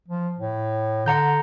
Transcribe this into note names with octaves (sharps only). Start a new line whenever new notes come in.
F3
A2
D3 F#5 A#5 G6